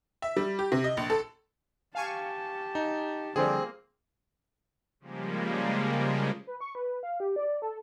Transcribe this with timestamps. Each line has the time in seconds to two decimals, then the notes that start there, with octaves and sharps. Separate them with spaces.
0.22 E5
0.36 G3
0.59 G4
0.72 C3
0.84 D#5
0.97 A#1
1.10 A4
1.95 G4 F5 G#5 A5 C#6
2.75 D#4
3.36 D3 F3 G3 A#3 C4 G#4
5.00 C#3 F3 G3 G#3 A#3
6.47 B4
6.61 C#6
6.75 B4
7.03 F5
7.20 G4
7.36 D5
7.62 A4